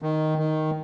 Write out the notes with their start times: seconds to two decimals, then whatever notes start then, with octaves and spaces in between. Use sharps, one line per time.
0.02 D#3
0.38 D#3